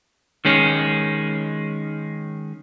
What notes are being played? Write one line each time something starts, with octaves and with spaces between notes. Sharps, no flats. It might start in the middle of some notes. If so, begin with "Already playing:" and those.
D#3 G#3 C#4